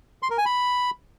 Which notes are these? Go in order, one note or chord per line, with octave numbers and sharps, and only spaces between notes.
C6
A#4
G#5
B5